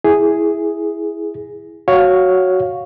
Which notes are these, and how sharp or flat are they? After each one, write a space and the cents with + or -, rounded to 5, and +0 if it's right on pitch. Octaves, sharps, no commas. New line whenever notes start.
E4 +0 G#4 +0
F#4 +0 C#5 +0 F5 +10